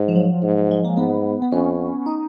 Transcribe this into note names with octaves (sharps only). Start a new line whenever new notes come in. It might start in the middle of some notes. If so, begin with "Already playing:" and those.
Already playing: G#2
F3
F#3
G#2
G#3
A#3
G#2 B3
B3
F2 C#4
D#4